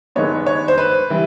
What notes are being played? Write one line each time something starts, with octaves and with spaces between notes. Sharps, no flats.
G2 D#3 G#3 B3 D4 C#5
C#5
C5
B4
E3 G3